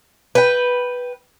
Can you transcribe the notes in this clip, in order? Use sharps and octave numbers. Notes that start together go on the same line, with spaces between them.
B4 G5